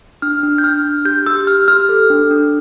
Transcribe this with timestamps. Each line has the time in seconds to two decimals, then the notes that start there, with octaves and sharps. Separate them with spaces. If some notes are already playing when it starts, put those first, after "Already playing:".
0.22 D4 F6
0.43 D4
0.58 G6
0.64 D4 F6
0.85 D4
1.05 G4 G6
1.26 G4 E6
1.47 G4 F6
1.68 G4 F6
1.89 A4
2.10 D4
2.31 D4